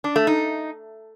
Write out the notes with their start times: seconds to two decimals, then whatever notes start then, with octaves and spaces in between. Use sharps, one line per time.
0.04 D4
0.16 A3
0.27 D#4